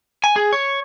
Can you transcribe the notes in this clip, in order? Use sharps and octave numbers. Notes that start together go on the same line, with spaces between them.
G#5
G#4
C#5